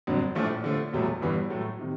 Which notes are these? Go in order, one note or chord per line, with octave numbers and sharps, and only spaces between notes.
G1 F2 D3 F#3
A#1 A2 F3 A3 D4
D3 F3 A3
E1 E2 B2 F#3 A3
G1 G2 E3 G3 B3
A2 F#3 A3
C3 D#3